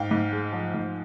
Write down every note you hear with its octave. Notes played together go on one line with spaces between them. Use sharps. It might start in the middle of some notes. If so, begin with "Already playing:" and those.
Already playing: G#2 F5 G5
G#2
G#3
F3
G#2